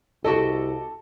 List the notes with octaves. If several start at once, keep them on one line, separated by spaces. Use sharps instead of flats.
C2 F#4 G4 A4 D#5